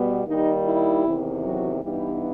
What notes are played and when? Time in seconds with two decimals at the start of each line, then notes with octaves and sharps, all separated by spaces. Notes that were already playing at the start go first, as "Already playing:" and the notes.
Already playing: B2 G3 B3
0.25 D#2 D#3 G3 D#4
0.65 E4
1.04 E2 C3 D#3
1.43 F#3 F#4
1.82 G2 E3 G3 B3 D#4 G4